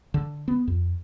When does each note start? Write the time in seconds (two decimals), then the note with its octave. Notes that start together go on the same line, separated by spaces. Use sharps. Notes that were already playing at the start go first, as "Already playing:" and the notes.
0.14 D3
0.48 B3
0.67 F2